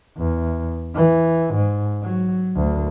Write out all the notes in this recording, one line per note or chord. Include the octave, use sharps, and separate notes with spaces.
E2
E3
G#2
F#3
D2